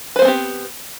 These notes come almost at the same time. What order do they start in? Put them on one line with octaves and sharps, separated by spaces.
B4 C5 B3 C4 G4